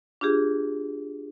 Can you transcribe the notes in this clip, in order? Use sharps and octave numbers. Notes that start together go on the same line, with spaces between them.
D4 F4 G4 G#4